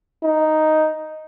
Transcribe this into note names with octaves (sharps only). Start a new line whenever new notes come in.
D#4